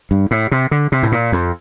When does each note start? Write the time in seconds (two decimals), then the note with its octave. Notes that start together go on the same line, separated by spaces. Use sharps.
0.11 G2
0.31 A2
0.51 C3
0.71 D3
0.92 C3
1.03 A2
1.12 A#2
1.32 F2